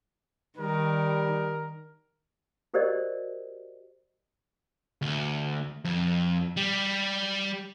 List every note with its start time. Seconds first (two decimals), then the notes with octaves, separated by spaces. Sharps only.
0.58 D#3 G3 A#4
2.74 F#4 G4 A#4 C5 D5 D#5
5.02 D2
5.85 F2
6.57 G3